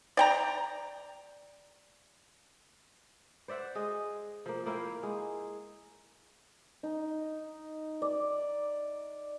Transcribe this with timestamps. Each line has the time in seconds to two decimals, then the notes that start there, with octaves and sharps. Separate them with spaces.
0.17 D5 G5 A#5
3.48 C5 D5 E5 F#5
3.75 G#3 D#5
4.46 F3 A#3
4.66 A#3 E4 F5 G5
5.03 G#3
6.83 D#4
8.02 D5